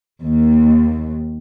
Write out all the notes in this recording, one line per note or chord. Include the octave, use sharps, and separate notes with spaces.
D#2